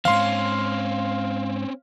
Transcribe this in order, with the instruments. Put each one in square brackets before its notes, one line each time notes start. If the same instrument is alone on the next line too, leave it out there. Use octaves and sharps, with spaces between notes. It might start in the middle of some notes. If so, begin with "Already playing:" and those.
[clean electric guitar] E2 G#2 [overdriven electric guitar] C4 C#4 [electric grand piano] F5 C6